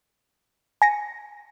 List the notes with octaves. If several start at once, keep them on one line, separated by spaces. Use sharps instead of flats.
G#5 A#6 C#7